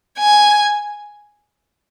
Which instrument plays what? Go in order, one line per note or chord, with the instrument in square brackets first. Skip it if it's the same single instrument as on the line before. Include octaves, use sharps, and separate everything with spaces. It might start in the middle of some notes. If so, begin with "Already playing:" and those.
[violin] G#5